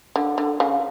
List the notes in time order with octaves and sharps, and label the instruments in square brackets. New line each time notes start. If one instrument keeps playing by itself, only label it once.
[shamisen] D3
D3
C#3